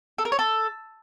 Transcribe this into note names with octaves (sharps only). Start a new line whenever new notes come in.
A4
A#4
C#5
A4